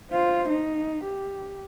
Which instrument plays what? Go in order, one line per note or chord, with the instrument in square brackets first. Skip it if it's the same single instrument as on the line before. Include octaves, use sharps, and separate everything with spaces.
[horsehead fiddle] F4 C5
D#4
G4